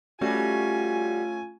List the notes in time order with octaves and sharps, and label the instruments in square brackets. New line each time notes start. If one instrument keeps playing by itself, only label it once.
[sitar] G3 F#4 [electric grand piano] A3 C#4 [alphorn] F4 [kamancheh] G#5